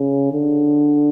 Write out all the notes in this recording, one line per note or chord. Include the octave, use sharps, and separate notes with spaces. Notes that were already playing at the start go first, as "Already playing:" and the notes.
Already playing: C#3
D3